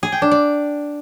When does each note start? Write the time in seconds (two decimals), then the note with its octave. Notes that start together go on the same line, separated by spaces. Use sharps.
0.03 G#4
0.12 G5
0.22 D4
0.31 D5